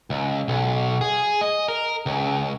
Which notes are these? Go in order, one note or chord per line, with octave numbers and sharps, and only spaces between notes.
C#2
B1
G#4
D#5
A#4
C#2